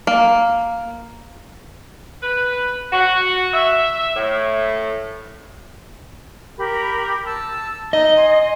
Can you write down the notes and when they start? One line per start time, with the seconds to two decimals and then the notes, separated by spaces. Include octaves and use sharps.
0.07 A#3
2.23 B4
2.92 F#4
3.53 E5
4.16 A2
6.58 G4 A#4 B5
7.25 A5 E6
7.93 D#4 D#5
8.16 G#5 C6